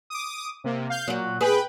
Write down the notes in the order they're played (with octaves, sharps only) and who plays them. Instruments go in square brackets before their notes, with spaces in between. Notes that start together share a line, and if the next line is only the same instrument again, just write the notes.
[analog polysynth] D6 D#6
C3 A#3
F5 G6
[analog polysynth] A#2 [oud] F#3 F#4
[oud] B3 G#4 [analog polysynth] B4 G5 B5